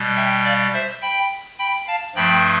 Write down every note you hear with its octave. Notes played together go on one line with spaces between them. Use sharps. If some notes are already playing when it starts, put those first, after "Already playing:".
Already playing: B2 G3
E5 G5
D5 F5
C5 E5
G5 B5
G5 B5
F5 A5
G2 F3 A3 G5 B5